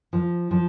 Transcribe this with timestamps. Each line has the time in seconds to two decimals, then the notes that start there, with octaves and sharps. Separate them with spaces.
0.13 F3
0.51 F3